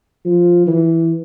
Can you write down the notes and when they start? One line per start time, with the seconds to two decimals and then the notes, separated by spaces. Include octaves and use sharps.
0.25 F3
0.67 E3